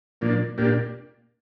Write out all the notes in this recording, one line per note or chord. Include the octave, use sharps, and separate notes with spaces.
A#2 F3 A#3 D4
A#2 A#3 D4 G4